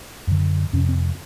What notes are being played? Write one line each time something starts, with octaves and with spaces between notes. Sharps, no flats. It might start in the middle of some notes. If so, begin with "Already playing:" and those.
F#2 D3
F2 C3 C#4
C4